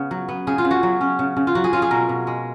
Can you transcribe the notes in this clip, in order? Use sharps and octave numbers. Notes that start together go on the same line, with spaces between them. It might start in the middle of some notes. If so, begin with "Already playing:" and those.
Already playing: C#3 B3
F#3
B3
C#3 G#4
F4
C#3
F#4
F#3
C#4
C#3
C#3
F4
F#3 F#4
G#4
C#4 F4
G#4
B2 A#4
B2
G#3